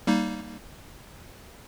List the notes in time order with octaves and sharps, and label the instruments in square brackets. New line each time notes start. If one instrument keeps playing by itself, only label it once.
[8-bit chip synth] G3 A#3 D#4